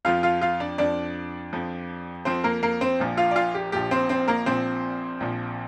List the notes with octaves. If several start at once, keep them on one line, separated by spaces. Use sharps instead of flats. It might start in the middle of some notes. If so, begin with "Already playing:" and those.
F2 F3 F4 F5
F4 F5
F4 F5
D4 D5
F2 F3 D4 D5
F2 F3
F2 F3 C4 C5
A#3 A#4
A#3 A#4
C4 C5
A#1 A#2 F3
F4 F5
D5
F4 F5
G4
A#1 A#2 F3 G4
C4 C5
C4 C5
A#3 A#4
A#1 A#2 F3 C4 C5
A#1 A#2 F3